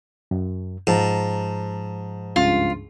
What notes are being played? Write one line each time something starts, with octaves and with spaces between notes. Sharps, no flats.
F#2
G#2 F3 A5 A#5
C#2 G2 F4